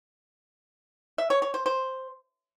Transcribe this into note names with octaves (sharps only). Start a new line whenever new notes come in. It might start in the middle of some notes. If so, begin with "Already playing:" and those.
E5
C#5
C#5
C5
C5